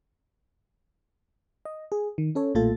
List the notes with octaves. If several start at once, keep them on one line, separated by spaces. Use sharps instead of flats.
D#5
G#4
D#3
C#4 A4 C#5
B1 A#2 A3 F4 A4 A6